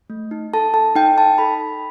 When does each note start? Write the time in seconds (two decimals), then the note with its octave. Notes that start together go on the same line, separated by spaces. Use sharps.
0.10 A3
0.31 D#4
0.54 A4 A5
0.74 A4 A5
0.96 D#4 G5
1.17 D#4 A5
1.38 A4 B5
1.60 A4